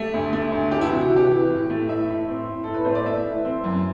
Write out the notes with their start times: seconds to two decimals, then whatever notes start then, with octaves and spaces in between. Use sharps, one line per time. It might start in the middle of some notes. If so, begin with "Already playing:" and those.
Already playing: A3 G4
0.14 D2
0.33 A3
0.52 D2
0.71 E3 G4
0.81 E4
0.87 C3 F#4
1.01 F#4
1.11 E3
1.16 G4
1.31 E3
1.50 A2
1.70 A3
1.88 A2 E5
2.09 A2
2.29 C4
2.47 A2
2.64 A2 A4
2.74 B4
2.85 A3 C5
2.95 D5
3.06 A3 E5
3.26 E3
3.45 C4
3.64 F#2